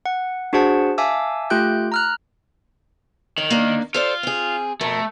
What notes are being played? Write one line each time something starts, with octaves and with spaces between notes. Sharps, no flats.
F#5
D4 F#4 G#4 C5 F#5 A5
E5 F5 G#5 A5 D6 E6
A3 F4 G4 G5 F#6 G6
A#5 F6 F#6
D#3 C#5
A#3 D4
F4 A4 C5 D5
C4 G#4
F2 B2 A3 A#4